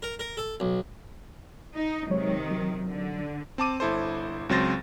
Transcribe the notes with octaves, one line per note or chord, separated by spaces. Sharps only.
A#4
A#4
A4
B1
D#4
C3 D#3 F#3 G#3 C#5
F#3
D3
C4 A5 D6 D#7
G1 E4 A4 C5
C#2 F#3 C4 C5 A6 A#6